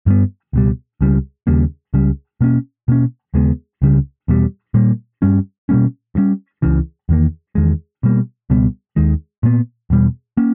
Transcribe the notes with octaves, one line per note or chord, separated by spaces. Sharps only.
G2 G3 B3
C#2 B2 G3
C#2 C#3 G3
D#2 C#3 G3 A#3
C#2 C#3 G3
B2 A#3 C#4
B2 A#3 C#4
D#2 C#3 G#3 B3
C#2 C#3 G3
E2 B2 G3
A#2 G3 A#3
G2 G3 C#4
B2 G3 A#3 C#4
G2 G3 C#4
C#2 C#3 E3
E2 D#3 A#3
E2 D#3 G#3
B2 G3 A#3
C#2 B2 G3 B3
D#2 D#3 G#3
A#2 G#3 B3
E2 B2 G3
A#3 C#4